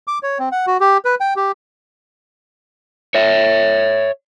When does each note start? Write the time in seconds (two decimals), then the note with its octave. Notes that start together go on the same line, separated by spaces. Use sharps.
0.08 D6
0.23 C#5
0.39 C4
0.52 F#5
0.67 F#4
0.80 G4
1.05 B4
1.20 G5
1.36 G4
3.15 C#5 E5